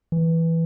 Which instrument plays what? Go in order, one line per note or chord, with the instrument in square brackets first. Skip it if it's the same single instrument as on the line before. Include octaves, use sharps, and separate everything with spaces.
[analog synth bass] E3